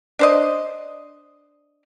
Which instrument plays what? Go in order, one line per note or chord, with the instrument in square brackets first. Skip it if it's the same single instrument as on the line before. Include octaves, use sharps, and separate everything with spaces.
[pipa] D4 C5 D#5